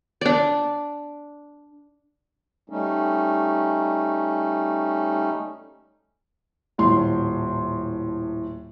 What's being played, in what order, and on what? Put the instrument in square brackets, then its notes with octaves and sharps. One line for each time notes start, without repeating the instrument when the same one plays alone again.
[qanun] D4 D5
[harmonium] G3 A3 C#4 D#4
[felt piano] D#1 A2 C6